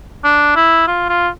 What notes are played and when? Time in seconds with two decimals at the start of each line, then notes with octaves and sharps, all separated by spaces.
0.24 D4
0.56 E4
0.88 F4
1.10 F4